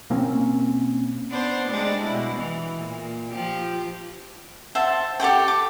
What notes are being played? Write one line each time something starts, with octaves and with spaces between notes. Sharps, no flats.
B2 A#3 C4 C#4
B3 D4 C5
G3 G#3 D4
B2 E4
E3
A#2
F3 G4
C5 E5 F#5 A5
G4 A4 F#5 G5
D6